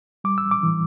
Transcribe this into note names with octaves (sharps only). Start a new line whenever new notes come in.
G3 D6
E6
D6
E3